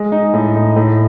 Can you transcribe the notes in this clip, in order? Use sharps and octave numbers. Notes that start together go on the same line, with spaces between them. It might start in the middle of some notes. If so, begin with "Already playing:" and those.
Already playing: G#3
D#4
A2
D#4
A2